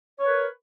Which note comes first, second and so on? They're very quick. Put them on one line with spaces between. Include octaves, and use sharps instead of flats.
C#5 B4 A#4